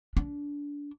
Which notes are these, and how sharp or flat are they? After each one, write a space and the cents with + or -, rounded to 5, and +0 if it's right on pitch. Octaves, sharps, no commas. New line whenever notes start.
D4 -25